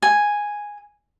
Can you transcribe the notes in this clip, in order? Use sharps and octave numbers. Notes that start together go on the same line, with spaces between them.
G#5